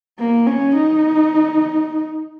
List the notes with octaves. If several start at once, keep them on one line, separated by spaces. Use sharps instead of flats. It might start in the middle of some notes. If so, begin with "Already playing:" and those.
A#3
C#4
D#4